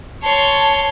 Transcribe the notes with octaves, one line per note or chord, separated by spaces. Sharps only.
C#5 A5 C6